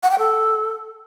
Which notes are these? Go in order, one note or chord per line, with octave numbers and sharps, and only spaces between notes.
F#5
G5
A4